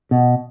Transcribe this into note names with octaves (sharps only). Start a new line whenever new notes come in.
B2